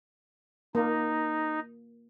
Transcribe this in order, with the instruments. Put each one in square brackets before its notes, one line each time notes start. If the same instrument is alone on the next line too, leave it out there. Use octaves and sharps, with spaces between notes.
[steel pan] A#3 [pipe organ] D#4